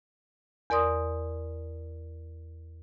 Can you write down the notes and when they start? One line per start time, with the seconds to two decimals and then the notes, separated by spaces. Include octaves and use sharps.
0.70 E2 A#4 D5 C6 D#6